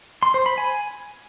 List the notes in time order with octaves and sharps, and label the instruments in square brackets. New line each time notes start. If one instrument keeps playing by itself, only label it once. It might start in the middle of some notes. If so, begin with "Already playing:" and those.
[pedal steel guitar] C6
C5
B5
G#5